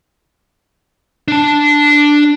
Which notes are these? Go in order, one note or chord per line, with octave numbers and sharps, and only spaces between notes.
D4 A5